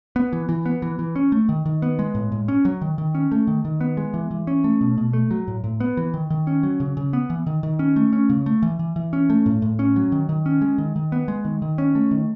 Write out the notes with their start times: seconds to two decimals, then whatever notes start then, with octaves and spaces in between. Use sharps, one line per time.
0.16 B3
0.33 E3
0.49 E3
0.66 B3
0.82 E3
0.99 E3
1.16 C#4
1.32 A3
1.49 D#3
1.66 D#3
1.82 B3
1.99 G#3
2.15 A2
2.32 A2
2.48 C#4
2.65 F#3
2.82 D#3
2.98 D#3
3.15 C#4
3.32 A3
3.47 D#3
3.65 D#3
3.81 B3
3.97 G#3
4.14 E3
4.31 E3
4.47 C#4
4.64 A3
4.81 B2
4.97 B2
5.13 A3
5.31 F#3
5.48 A2
5.64 A2
5.80 B3
5.97 E3
6.14 D#3
6.30 D#3
6.47 C#4
6.63 F#3
6.80 C#3
6.97 C#3
7.13 B3
7.30 E3
7.47 D#3
7.63 D#3
7.79 C#4
7.96 A3
8.13 C#4
8.30 C#3
8.46 A3
8.63 E3
8.79 E3
8.96 E3
9.13 C#4
9.30 A3
9.46 A2
9.62 A2
9.79 C#4
9.96 F#3
10.12 D#3
10.29 D#3
10.46 C#4
10.61 G#3
10.78 D#3
10.96 D#3
11.12 B3
11.28 G#3
11.45 D#3
11.62 D#3
11.78 C#4
11.95 A3
12.11 D#3